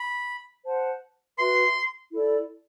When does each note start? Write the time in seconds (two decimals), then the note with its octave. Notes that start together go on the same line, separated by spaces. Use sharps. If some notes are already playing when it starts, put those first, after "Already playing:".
Already playing: B5
0.65 C5 F#5 A5
1.37 F#4 B4 E5 C6
2.11 E4 A4 D5